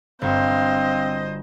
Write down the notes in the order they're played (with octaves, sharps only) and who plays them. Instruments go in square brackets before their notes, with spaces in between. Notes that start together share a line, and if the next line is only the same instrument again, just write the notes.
[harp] G1 F#4 [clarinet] C4 [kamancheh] C5 D#5 [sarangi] F5